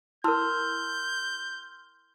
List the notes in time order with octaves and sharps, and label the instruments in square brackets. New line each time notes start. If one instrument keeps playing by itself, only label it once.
[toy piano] E4 A#4 [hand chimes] C6 E6 F6 [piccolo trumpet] G6